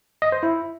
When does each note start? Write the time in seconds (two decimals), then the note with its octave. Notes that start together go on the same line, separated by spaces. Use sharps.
0.22 D#5
0.32 C5
0.43 E4